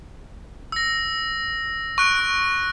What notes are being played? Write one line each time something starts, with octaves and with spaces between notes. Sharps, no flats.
E6 A#6
C#6 F#6 D7